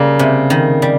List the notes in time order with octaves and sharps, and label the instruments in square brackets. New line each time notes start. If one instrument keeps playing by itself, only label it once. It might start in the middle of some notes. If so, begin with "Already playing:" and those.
Already playing: [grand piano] C#3 [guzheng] G3 A#3
[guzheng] C3
D#3
G3